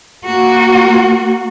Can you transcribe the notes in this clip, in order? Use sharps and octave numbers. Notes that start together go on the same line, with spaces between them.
A#3 F#4